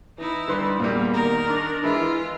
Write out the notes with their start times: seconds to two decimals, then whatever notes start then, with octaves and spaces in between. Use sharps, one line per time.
0.18 E3 D#4 E4
0.48 D3 G3 B4 C6
0.80 E2 A#2 G3 A#3
1.14 D#3 A#4 A#5
1.50 D4
1.84 E3 G#3 E4 F4